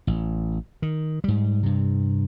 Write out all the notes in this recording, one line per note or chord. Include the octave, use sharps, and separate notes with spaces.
A1
D#3
G#2 G3
G2 C3